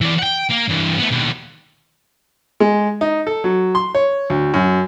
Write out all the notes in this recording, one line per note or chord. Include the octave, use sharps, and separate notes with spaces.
E3 D5
F#5 G5
A#3
G2 E3
A3 B3
D#2 B2
G#3
D#4
A4
F#3
C6
C#5
D2
F#2